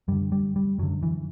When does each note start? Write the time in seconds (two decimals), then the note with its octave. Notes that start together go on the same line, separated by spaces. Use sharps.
0.08 F#2 D3 G3
0.32 G3
0.56 G3
0.79 F#2 D3 F#3
1.03 E3